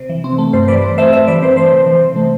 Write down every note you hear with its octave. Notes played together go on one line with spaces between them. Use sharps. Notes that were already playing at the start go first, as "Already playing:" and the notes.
Already playing: C3
E3
C4
A3
G2 C5
E3 B4 D5
C4
A3 C5 E5
G2 C5 E5
E3 B4 D5
C4 C5
A3 C5
C3
E3
C3
A3